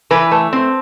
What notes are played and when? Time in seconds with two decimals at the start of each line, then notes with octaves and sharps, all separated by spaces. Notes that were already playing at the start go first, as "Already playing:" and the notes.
0.11 E3 B4
0.31 A3
0.53 C4